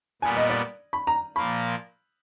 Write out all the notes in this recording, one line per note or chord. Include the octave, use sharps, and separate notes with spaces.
A#2 G3 B3 G#5
D#5
D5
B5
A#5
A#2 F3 A#3 B5